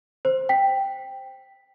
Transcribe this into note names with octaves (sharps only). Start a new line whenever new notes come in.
C5
G5 B6